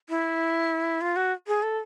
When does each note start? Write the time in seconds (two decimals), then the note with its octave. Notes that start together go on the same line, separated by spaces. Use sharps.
0.09 E4
1.01 F4
1.16 F#4
1.47 G#4
1.63 A4